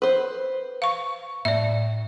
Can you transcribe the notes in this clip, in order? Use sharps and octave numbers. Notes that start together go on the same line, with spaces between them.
B4 C5
F5 C#6
A2 D5 E5